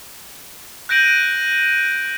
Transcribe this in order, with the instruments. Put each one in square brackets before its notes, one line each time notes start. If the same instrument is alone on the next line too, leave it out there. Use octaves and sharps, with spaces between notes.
[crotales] F#6 G6 A#6 D7 D#7 F#7